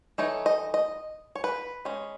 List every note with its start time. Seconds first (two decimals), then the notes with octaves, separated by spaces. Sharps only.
0.18 E3 A3 D#4 C#5
0.46 D#5
0.74 D#5
1.35 C#5
1.44 B4
1.85 G#3 C#4